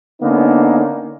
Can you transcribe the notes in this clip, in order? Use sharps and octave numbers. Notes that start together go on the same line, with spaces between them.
D3 A#3 B3 C#4 D#4